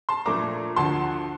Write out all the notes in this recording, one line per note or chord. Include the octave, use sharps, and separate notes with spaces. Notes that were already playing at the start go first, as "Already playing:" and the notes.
A5 C6
A#2 F3 A3 D4 A#5 D6
D2 D3 F3 A5 C6